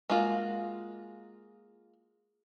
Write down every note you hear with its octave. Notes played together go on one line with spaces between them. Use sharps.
G#3 A#3 F4 F#4